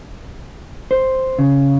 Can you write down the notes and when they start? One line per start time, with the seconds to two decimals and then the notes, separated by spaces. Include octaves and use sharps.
0.91 C5
1.39 C#3